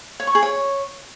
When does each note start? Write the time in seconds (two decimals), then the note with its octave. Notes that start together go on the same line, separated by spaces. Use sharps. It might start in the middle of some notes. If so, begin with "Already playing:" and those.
0.20 C#5
0.27 C#6
0.35 G#4
0.42 C#5